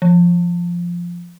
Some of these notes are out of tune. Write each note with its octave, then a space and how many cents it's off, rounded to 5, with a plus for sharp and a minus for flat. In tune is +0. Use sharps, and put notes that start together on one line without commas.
F3 -5